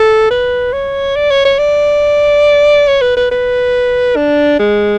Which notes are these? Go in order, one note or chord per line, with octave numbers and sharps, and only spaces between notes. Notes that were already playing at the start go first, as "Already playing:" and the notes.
Already playing: A4
B4
C#5
D5
C#5
C#5
D5
C#5
B4
B4
B4
D4
G#3